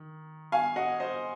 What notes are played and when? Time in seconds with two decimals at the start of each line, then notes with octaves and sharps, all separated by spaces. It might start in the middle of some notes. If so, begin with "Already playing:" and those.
Already playing: D#3
0.52 F5 G#5
0.76 D#5 F#5
1.00 C5 D#5